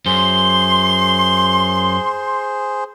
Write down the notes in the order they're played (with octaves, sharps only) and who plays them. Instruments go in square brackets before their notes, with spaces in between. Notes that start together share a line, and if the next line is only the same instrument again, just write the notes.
[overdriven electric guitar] F#2 [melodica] G#4 C5 [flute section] C6 [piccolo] G7